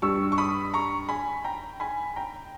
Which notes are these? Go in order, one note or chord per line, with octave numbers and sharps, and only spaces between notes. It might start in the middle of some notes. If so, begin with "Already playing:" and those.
G2 G3 C#6 E6
C#6
B5 D#6
A#5 C#6
G#5 B5
G5 A#5
G#5 B5
G5 A#5